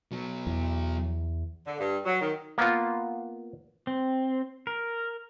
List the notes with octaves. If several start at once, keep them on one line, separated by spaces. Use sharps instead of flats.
B2 F#3
E2
D3
G2
F#3
D#3
A#3 B3 F4
C4
A#4